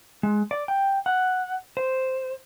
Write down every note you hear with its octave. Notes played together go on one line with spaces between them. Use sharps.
G#3
D5
G5
F#5
C5